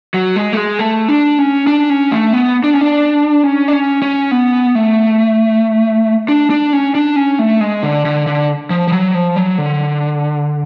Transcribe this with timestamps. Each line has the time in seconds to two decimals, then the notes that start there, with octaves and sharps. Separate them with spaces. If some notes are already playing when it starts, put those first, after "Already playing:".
0.14 F#3
0.36 G#3
0.53 A3
0.57 G#3
0.79 A3
1.08 D4
1.39 C#4
1.67 D4
1.90 C#4
2.11 A3
2.33 B3
2.64 D4
2.73 C#4
2.81 D4
3.44 C#4
3.68 D4
3.73 C#4
4.02 C#4
4.31 B3
4.75 A3
6.28 D4
6.50 D4
6.73 C#4
6.95 D4
7.16 C#4
7.39 A3
7.61 G#3
7.83 D3
8.05 D3
8.27 D3
8.70 F3
8.87 F3
8.92 F#3
9.14 F3
9.36 F#3
9.58 D3